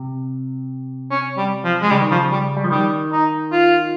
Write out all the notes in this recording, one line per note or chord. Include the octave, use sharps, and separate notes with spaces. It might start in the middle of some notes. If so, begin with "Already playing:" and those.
Already playing: C3
C#4
G3
F3
G#3
C#3 G3
D#3
C#3 F3
G3
G3
F3
D#3 G3
D#4
F4